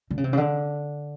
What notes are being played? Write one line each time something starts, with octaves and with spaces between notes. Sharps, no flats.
D3
C#3
C3
C#3
D3